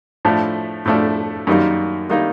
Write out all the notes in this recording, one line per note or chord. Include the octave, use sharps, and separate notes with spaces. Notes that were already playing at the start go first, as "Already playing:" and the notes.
A2 F3 A3 D4
A2 F3 A3 D4
F#2 D#3 G3 A#3 D#4
D#3 G3 A#3 D#4